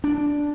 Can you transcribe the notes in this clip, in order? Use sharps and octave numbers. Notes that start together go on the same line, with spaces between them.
D4